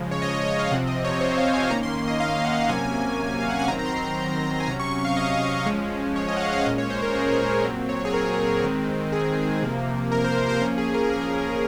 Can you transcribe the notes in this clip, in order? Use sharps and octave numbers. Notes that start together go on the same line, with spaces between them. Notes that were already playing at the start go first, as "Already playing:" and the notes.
Already playing: C#3 F3 G#3
C#5
D#5
C#5
C#5
F5
C3 F3 C4 F#5
D#5
C#5
C5
F5
G#5
D#3 A#3 C#4 A#5
C6
C6
D#5
F5
F#5
C3 F#3 A#3 C#4 G#5
F5
F#5
G#5
D#3 F#3 C4 A#5
A#5
C6
C6
G#5
C3 F#3 C#4 A#5
C#6
C#6
F5
D#5
F3 G#3 C#4
C#5
D#5
F#5
F5
F5
A#2 G#3 C#4 D#5
C#5
C5
A#4
G#4
A#4
A#4
A#2 F#3 C4
C#5
G#4
A#4
D#3 G#3 C4
G#4
C3 F3 A#3
A#4
C5
C5
F3 A#3 C#4 A#4
G#4
A#4
G#4